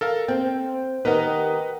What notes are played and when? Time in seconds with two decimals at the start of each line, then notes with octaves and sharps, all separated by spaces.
0.01 A4 A#4 F5
0.28 C4 C5 G5
1.05 D#3 G4 A#4 B4 D#5 F#5